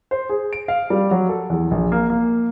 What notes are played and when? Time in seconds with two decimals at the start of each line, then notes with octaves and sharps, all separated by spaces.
0.11 C5
0.29 G#4
0.53 D7
0.68 F5
0.90 G3
1.11 F#3
1.29 A4
1.50 E2
1.71 A#1
1.92 A#3
2.10 A#3